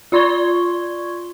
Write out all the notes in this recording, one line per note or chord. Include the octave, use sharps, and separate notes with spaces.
F4 D5 C6 C#6 G#6 G7